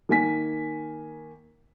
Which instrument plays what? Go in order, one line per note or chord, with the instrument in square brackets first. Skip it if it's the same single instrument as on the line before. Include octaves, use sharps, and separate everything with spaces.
[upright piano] D#3 A#3 G#5 B6